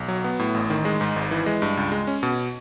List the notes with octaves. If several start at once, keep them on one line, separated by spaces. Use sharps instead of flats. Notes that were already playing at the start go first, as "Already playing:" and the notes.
Already playing: B1
F#3
B3
A2
A1
D#3
G#3
G#2
G#1
E3
G#3
G2
C#2
G#3
C#4
B2